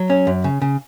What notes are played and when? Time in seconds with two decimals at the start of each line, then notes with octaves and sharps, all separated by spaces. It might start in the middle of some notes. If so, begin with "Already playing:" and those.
Already playing: F#3
0.10 C#4
0.27 F#2
0.44 C#3
0.62 C#3